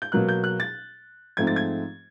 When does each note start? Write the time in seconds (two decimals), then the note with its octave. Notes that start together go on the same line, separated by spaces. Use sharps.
0.02 G6
0.12 B2 F#3 A#3 F#6
0.29 G6
0.44 F#6
0.60 A6
1.37 G#2 F3 A3 C4 G#6
1.47 A6
1.56 G#6